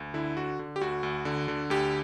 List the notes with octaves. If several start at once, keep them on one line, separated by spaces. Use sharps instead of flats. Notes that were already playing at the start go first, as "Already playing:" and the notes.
Already playing: D2
D3 E4
D3 F#4
D3
G4
D2 F#4
D2
D3
D3
D2 G4